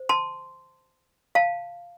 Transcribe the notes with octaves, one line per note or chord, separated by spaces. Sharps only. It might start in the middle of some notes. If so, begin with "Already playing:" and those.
Already playing: C5
A5 C6
F5 A5